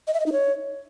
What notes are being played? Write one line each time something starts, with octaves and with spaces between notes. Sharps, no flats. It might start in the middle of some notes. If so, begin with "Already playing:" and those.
D#5
E5
D#5
D#4
C#5